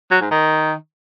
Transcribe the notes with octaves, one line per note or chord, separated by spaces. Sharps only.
F#3
G#2
D#3